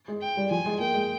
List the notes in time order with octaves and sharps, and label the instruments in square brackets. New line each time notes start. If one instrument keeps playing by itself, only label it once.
[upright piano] G#3
[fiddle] G5
[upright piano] G3
[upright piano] F3 [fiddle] G#5
[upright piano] G#3
[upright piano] A#3 [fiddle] G5
[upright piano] G#3